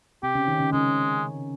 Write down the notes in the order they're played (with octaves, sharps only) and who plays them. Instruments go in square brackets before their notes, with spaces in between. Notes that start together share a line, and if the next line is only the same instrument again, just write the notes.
[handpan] C3 C4 [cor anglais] G4
[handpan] C#3 C#4
D#3 D#4
C#3 C#4
[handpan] C#3 C#4 [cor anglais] G#3